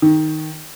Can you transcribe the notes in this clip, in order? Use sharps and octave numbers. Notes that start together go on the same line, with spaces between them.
D#3